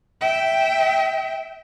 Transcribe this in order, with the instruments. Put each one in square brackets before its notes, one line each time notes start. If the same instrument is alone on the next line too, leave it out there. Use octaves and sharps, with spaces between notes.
[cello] E5 G5